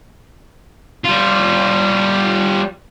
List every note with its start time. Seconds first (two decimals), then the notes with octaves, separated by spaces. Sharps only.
1.05 G3 F4